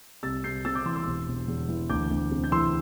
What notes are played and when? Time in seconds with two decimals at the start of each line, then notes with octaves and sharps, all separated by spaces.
0.23 C2 E6 A6
0.44 C2 G6 C7
0.65 C3 E6 A6
0.75 D6 G6
0.85 E3 C6 E6
0.96 C6 E6
1.07 E1
1.28 E1
1.48 E2
1.69 E3
1.90 D2 D6 G6
2.11 D2
2.31 C3
2.44 G6
2.52 E3 C6 E6